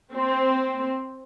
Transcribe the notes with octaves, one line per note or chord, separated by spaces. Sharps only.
C4